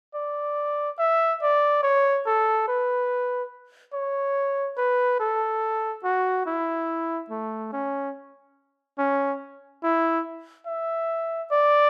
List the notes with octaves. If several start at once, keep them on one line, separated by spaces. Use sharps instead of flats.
D5
E5
D5
C#5
A4
B4
C#5
B4
A4
F#4
E4
A3
C#4
C#4
E4
E5
D5